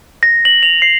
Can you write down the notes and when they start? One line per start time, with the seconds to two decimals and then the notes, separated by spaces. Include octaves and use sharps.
0.23 A#6
0.45 F#7
0.63 F7
0.82 C7